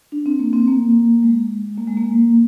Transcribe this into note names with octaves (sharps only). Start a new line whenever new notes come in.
D4
C4
A#3
C4
A#3
G#3
A#3
G#3
A#3